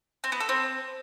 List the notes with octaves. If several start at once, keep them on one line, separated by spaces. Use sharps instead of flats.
C4
B3
A4
C4